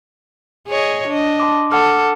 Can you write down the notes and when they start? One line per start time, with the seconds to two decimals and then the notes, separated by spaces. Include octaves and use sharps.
0.68 G#4 C#5 D#5
1.08 D4 D#5
1.40 A5 C6 D6
1.72 A4 F#5 D6 F6